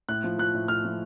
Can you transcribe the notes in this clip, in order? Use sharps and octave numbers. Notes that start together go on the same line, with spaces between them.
A2 F#6
F3
F3 F#6
A2
A2 F6
F3